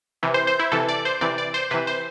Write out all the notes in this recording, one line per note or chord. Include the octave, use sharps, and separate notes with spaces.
C3 E3
C5
C5
E4
C3 E3 A4
D5
C5
C3 E3 D5
D5
C5
C3 E3 B4
C5